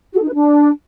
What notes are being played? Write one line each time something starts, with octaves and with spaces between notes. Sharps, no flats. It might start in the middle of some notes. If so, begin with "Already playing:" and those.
F#4
A4
D#4
B4
D4